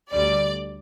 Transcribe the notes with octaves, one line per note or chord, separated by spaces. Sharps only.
D2 D3 G3 D5